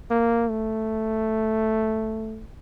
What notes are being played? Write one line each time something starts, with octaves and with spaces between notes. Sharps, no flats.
A#3
A3